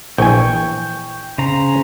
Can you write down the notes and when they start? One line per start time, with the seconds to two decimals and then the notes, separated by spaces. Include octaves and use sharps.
0.18 A#1 E3 G5 G#5 C#6
1.38 C#3 C5 A#5